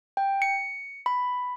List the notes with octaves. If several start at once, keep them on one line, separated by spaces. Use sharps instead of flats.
G5
C#7
B5